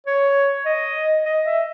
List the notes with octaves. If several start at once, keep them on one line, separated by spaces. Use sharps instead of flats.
C#5
D#5
D#5
E5